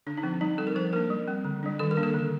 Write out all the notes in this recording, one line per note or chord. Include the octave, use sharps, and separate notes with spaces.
D3 D4
D#4
F3 C4
G3 D#4
C4 A4
A#4
F3 C5
A#3 D4 A#4
G3
C4
D3
G3 D4
D#3 A4
A#4
A#3 D4
A4
D3